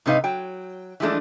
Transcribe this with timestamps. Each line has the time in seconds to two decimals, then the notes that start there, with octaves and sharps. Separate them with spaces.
0.06 G#2 C3 D#4 B4 F5
0.24 F#3 G5
1.00 E3 F3 G#3 A3 D4